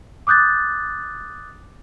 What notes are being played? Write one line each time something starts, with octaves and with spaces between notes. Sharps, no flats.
D6 D#6 F#6 G6 A6